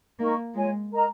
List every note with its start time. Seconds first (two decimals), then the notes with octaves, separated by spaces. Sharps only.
0.19 A#3 D#4 A#4 D#5 C#6
0.55 G#3 F4 C#5 G#5
0.91 A#4 D#5 A#5